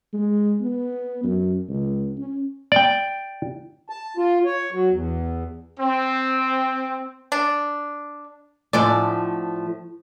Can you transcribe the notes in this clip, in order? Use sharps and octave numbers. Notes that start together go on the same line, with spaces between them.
G#3
B3
F#2
C#2
C#4
D5 G5
A5
F4
C#5
F#3
E2
C4
D4
A2 D3 F3 G#3 A3 D5